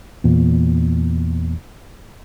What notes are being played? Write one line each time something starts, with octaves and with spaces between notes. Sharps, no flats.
E2 A#2